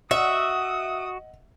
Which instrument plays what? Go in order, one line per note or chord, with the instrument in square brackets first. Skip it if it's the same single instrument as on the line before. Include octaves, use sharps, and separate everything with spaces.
[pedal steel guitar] F#4 [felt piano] D#5 F#5 [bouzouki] E5 [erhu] D#6